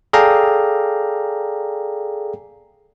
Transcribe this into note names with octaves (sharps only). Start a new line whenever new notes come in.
G#4 A4 D5 F5 G5 A#5